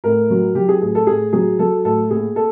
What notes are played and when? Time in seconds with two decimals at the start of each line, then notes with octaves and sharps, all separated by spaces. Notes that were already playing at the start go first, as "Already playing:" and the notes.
0.04 A2 A#4
0.30 F#3
0.55 F#3 G4
0.69 G#4
0.82 A2 G#4
0.95 A4
1.07 A2 G#4
1.33 F#3 G#4
1.59 F#3 A4
1.85 A2 A4
2.10 A#2 G#4
2.36 A4